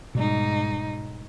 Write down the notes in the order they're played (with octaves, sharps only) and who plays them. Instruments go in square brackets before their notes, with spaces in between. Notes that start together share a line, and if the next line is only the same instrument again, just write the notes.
[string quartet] G#2 D#4 [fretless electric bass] B2 G3